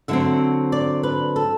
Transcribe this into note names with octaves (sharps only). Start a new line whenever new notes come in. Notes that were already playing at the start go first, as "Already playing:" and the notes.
D3 F#3 C4 E5
D5
B4
A4